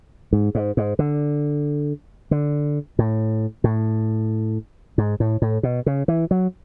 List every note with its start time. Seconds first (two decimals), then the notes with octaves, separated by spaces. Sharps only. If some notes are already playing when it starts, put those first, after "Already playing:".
0.33 G#2
0.55 G#2
0.77 G#2
0.99 D3
2.31 D3
2.99 A2
3.64 A2
4.98 G#2
5.20 A2
5.42 A2
5.63 B2
5.86 C#3
6.08 E3
6.31 F#3